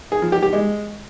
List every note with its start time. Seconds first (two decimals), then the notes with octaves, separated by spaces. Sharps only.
0.12 G#4
0.22 F3
0.32 G4
0.43 G4
0.53 G#3